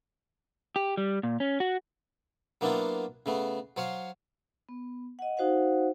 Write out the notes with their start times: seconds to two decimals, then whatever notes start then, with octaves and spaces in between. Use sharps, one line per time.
0.76 G4
0.97 G3
1.23 A#2
1.40 C#4
1.60 F#4
2.61 F#3 A#3 B3 D4 E4 F4
3.26 C#3 A3 B3
3.77 F#3 C5 C#5 F5
4.69 B3
5.19 D#5 F#5
5.37 D#4 F#4 C5 F5 F#5